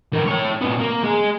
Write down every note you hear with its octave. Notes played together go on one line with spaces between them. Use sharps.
E3 A#4
E4 C#5
A#2 B3
A#3
G#3 G#4